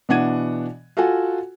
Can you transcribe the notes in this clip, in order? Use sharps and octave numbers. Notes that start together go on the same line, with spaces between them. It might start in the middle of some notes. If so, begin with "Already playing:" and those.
B2 E3 D4 F#5 G#6 D#7
F4 F#4 A4 F#5 G#5